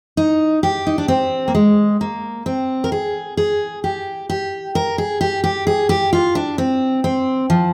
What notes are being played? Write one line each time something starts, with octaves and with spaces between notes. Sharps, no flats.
D#4
G4
D#4
D4
C4
A#3
G#3
A#3
C4
A#4
G#4
G#4
G4
G4
A#4
G#4
G4
G4
G#4
G4
F4
D4
C4
C4
F3